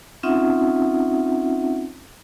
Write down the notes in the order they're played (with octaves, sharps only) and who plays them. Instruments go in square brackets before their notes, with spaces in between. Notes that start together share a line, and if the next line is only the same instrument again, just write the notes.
[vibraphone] C4 C#4 D#4 F4 E5 F#5